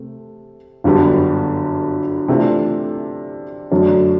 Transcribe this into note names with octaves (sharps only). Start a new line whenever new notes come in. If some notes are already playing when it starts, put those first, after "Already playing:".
Already playing: C3 A3
G1 F#2 D3 G3 B3
C3 E3 A3 D4 F4
F#2 D3 F#3 A3 D4